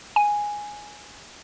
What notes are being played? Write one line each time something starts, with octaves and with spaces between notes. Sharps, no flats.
G#5